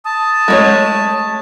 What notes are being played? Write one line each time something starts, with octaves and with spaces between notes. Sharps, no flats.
A5 D#6
G#3 A3 C#5